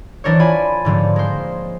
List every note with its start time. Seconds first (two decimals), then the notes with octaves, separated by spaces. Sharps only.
0.24 E3 D4 A#4 C5 C#5
0.40 F4 D5 G#5 B5
0.85 G#2 D3 F3 C4
1.16 G#3 A#3 C5